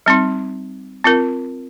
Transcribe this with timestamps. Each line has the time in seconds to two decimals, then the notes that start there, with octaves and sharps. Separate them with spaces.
0.06 G3 C4 D#4
1.04 C4 F4 A#4